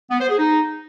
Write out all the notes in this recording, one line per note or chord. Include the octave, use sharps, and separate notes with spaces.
B3
C5
G#4
D#4